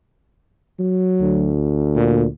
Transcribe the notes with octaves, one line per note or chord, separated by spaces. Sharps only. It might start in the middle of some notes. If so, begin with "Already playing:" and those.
F#3
D2
A#2